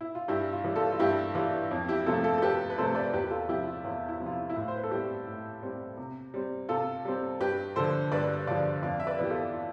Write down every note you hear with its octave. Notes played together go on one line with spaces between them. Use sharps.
E4
F4
G2 E4 G4
F4
E3 G3
F4 A4
F4
G2 E4 G4
E3 G3 F4
F2
E4 G4
C3 F3 A3 F4 A4
F4 A4
A4
F2 G4 B4
B4
C3 F3 A3 A4 C5
B4 D5
E2 G4 B4
G4
F4 A4
C3 F3 E4 G4
F4
E2 F4
E4
C3 F3
F4
E4
E4
A2 F4
C5
B4
A4
G3 C4 E4 G4
A2
G3 C4
C3
G3 C4
C3 F4 A4
G3 C4
G2 G4 B4
D3 F3 A4 C5
G2 B4 D5
D3 F3 D5 F5
F2 D5 F5
E5
B4 D5
E3 B3 G4
F4 A4
F4